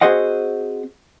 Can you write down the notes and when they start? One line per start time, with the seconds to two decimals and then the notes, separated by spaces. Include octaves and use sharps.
0.01 C4 F#4 G#4 C5 D#5 F#5